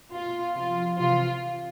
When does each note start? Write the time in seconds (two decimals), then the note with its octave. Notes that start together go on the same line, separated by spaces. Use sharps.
0.12 B2 F4
0.56 C3 F3 F4
0.99 C3 E3 F4